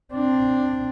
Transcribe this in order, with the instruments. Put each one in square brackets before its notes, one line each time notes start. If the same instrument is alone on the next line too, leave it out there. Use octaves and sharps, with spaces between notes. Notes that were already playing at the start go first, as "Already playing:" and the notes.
[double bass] C4 D4